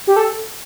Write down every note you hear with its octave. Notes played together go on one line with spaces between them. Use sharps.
G4
A4